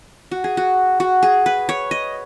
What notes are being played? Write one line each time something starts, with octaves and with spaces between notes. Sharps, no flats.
F#4
G#4
F#4
F#4
G#4
B4
C#5
D#5